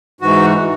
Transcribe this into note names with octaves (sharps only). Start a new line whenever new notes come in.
G#2 E3 F#4